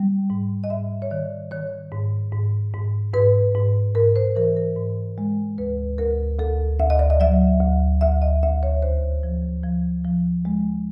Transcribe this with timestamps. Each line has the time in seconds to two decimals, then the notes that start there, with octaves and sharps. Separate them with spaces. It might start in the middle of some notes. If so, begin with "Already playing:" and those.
Already playing: G3
0.30 G#2
0.64 D#5
0.70 G#2 E5
1.02 C#5
1.11 D#3 D5
1.51 D#3 C#5
1.91 G#2
2.32 G#2
2.74 G#2
3.13 G#2 B4
3.55 G#2
3.95 G#2 A#4
4.16 C5
4.36 E3 A#4
4.56 A#4
4.77 G#2
5.18 G#3
5.58 D2 B4
5.98 D2 A#4
6.39 D2 A4
6.79 D2 E5
6.90 D#5
6.99 D5
7.10 D#5
7.20 F#3 E5
7.61 D2
8.01 D2 E5
8.22 D#5
8.43 D2 E5
8.63 C#5
8.82 D#2 C5
9.23 F3
9.63 F3
10.05 F3
10.45 G#3